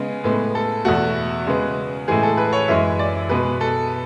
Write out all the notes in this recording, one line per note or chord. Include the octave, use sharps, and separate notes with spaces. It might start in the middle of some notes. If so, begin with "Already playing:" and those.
Already playing: C#3 G#3 B3
A2 G#3 B3
A4
E2 B2 A3 F#4
C#3 G#3 B3
A2 E3 G#3 G#4
A4
B4
C#5
F#2 E3 G#3 E5
D5
B2 G#3 B3 B4
A4